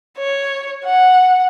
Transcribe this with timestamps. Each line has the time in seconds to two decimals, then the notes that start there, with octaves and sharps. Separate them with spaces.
0.19 C#5
0.85 F#5